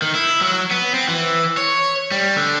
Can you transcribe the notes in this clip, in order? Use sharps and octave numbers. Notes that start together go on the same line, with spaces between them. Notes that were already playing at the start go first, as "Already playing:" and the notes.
D#3
E4
F#3
B3
C4
E3
C#5
G3
D3